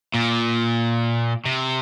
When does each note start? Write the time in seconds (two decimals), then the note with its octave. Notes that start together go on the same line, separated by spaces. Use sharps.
0.14 A#2
1.46 C3